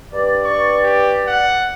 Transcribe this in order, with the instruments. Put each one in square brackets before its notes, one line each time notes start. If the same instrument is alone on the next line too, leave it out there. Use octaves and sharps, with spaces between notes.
[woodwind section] G2 D5
[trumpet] C#6
G4
F#5